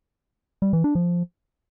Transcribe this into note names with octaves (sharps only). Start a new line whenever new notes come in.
G3
E3
D4
F3